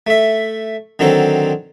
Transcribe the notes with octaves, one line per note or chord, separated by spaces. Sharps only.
A3 E5
D3 D#3 F#3 C4 A4 C5